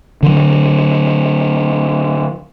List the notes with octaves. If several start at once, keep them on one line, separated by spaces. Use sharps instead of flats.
D3 F#3